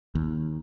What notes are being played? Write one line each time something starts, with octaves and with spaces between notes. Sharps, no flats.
D#2